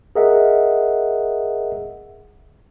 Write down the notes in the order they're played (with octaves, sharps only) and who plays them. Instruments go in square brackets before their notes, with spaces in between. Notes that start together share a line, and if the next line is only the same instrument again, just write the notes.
[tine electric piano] G#4 A#4 D#5 E5 F#5